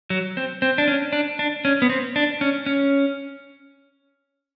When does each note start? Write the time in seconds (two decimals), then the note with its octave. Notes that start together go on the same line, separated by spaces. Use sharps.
0.10 F#3
0.37 C4
0.62 C4
0.78 D4
0.88 C#4
1.13 D4
1.39 D4
1.65 C#4
1.82 B3
1.90 C4
2.16 D4
2.41 C#4
2.66 C#4